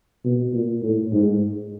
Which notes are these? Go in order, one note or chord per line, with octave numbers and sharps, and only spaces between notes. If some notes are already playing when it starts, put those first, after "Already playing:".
B2
A#2
A2
G#2